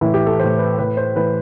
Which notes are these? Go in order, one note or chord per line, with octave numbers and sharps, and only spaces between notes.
A2 E3 E4
G4
A4
A2 E3 C5
B4
A2 E3 B4
C5
A2 E3 B4